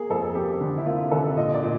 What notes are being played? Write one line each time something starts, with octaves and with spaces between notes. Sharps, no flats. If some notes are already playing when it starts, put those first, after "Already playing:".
Already playing: A#3 G#4
F2 A4
A#3 G4
D3
E4
A#3 F4
D3 A4
A#2 D#5
D5
A#2